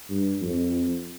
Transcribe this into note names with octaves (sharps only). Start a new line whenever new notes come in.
G2
F2